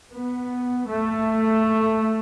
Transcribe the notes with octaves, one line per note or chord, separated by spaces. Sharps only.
B3
A3